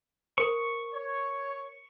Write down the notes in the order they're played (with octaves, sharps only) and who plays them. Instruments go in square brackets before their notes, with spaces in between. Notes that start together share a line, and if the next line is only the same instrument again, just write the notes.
[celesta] A#4 C5 [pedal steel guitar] C#6
[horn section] C#5